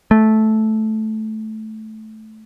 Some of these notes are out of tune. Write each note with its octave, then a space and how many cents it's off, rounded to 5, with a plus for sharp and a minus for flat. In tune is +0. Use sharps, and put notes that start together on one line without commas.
A3 -10